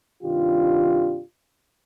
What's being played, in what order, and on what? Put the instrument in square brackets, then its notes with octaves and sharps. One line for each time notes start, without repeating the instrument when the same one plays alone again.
[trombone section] G2 C3 D#3 D4 F4 G4